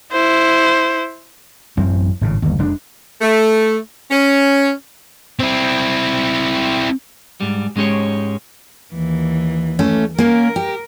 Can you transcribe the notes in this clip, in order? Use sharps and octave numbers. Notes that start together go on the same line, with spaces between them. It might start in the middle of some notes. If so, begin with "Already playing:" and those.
E4 C5
A1 F#2 C4
G#1 A2 C#3
G1 D#2
F1 G#3 D4
A3
C#4
C4 E4
G#2 G3
G#2 G#3 C#4 G4 C#5
D#2 E3
A3 C#4
A#3 C#4 A#4
G4